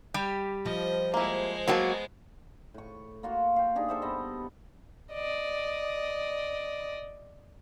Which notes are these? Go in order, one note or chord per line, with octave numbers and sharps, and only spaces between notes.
G3 G4
F3 D#5
G#3 A#3 E4 C5
F#3 A#3 B3 F#4 G5 A5
A2 C#6
A#3 F4 F#4
F5 G5
D4 D#4 G4 G#4
A4 C5 E5
G2 B3 D#5
D5 D#5